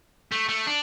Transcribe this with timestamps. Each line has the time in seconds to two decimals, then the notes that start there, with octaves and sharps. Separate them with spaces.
0.32 A3
0.49 A3
0.67 D4